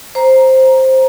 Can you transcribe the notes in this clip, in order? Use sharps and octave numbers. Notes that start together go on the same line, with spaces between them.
C5 A#5